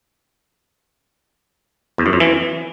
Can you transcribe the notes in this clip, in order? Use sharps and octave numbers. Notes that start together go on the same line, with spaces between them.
E2
F#2
F2
E3